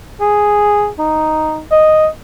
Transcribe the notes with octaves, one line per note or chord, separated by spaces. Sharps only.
G#4
D#4
D#5